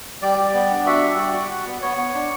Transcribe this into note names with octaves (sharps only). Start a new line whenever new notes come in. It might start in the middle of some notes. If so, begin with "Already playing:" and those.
G3 D5
G3
B3
D4
F#4 E5
G3
F#4 D5
F#4
F#4
B3
B3 C#5
B3
D4